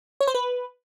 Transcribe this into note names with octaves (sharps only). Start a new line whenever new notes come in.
C#5
C5
B4